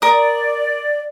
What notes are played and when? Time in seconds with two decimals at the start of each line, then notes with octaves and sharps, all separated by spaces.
0.02 A#4 D5 D#6